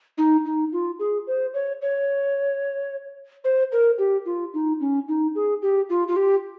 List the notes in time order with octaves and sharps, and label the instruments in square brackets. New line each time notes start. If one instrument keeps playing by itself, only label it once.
[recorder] D#4
D#4
F4
G#4
C5
C#5
C#5
C5
A#4
G4
F4
D#4
C#4
D#4
G#4
G4
F4
F4
G4